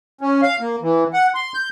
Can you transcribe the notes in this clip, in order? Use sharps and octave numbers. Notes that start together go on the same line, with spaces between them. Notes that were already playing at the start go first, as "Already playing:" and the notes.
C#4
F5
A#3
E3
F#5
C6
G6